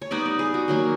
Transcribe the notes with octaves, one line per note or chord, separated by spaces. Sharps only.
C#5
G3 B3 D#4 D5
D5
G#4
F#4
D#3 F#3 A#3